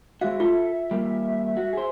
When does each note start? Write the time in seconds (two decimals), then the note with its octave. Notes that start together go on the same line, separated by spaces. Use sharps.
0.21 G#3 F#4 E5 F5
0.40 F4 A4
0.91 G3 A#3
1.57 F#4
1.73 G#4 C5